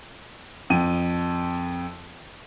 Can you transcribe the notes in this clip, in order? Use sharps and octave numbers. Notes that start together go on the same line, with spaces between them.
F2 D#7